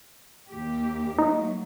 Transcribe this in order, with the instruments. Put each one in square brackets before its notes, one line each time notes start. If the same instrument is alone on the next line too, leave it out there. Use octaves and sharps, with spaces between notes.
[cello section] D#2 A#3 G4
[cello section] F#3 A3 A#3 [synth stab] D#4